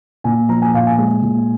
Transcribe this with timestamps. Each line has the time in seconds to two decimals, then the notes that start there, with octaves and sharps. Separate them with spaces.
0.24 A#2 G#5
0.49 F3 A#5
0.62 G#5
0.74 A#2 F5
0.87 G#5
0.98 G#3
1.22 A#2